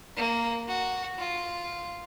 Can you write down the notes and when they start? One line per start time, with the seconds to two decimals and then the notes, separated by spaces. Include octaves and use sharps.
0.16 A#3
0.68 F#4
1.18 F4